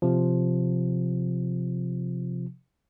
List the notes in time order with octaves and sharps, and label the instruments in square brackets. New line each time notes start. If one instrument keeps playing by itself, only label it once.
[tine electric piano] C3 F3